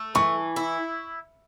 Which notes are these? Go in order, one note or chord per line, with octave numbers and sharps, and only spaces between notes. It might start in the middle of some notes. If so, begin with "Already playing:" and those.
Already playing: A3
E3 C#6
E4